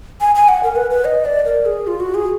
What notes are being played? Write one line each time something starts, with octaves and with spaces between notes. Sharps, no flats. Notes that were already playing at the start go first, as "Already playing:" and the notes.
G#5
G#5
F#5
A#4
B4
B4
D#5
D5
A#4
G#4
F4
F#4
G#4